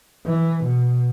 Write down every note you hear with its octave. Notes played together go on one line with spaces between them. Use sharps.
E3
B2